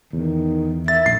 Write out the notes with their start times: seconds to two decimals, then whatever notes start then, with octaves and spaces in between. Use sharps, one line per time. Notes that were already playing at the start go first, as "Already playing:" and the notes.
0.13 E2 D#3
0.88 E5 A6
1.06 A#1 C7